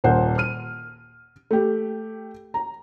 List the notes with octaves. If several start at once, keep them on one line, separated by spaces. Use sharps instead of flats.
D#1 A#2 C5 F#5
F6 D#7
A3 G4
A#5